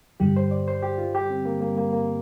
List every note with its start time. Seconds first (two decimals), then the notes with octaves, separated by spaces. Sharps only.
0.20 G2 D3 G3 G4
0.36 C5
0.51 D5
0.68 C5
0.83 G4
0.98 F4
1.15 G4
1.30 C4
1.45 A#3
1.61 A#3
1.77 A#3
1.93 A#3